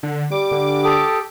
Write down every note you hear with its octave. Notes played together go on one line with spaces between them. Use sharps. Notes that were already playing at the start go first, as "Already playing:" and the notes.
D3
G3 D6
D3
G4 A4 D#6